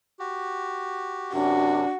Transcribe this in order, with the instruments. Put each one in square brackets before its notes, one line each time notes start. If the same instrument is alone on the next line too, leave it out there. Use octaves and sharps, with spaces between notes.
[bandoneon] F#4 G4
[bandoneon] F#2 C3 [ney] D4 [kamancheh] F#4